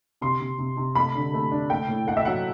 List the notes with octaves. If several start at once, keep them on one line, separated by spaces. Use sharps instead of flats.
C3 C6
C3
C3
C3
A3 B5
D3
A3
D4
A3 G5
A2
A3 F#5
E5
F#3 F#5